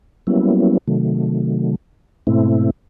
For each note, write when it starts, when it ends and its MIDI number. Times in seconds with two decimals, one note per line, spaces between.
0.27 0.77 54
0.27 0.77 55
0.27 0.77 58
0.27 0.77 59
0.27 0.77 61
0.27 0.77 64
0.88 1.75 48
0.88 1.75 51
0.88 1.75 54
0.88 1.75 57
2.27 2.70 44
2.27 2.70 47
2.27 2.70 57
2.27 2.70 60
2.27 2.70 64